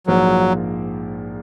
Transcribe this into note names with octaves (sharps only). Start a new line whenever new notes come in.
A#1 G#2 F3 F#3 A#3